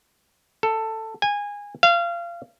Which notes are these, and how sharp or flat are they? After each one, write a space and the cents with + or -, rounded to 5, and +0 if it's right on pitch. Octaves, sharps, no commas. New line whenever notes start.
A4 +10
G#5 -20
F5 -25